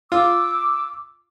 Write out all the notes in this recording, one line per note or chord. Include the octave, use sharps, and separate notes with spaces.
F4 D6 E6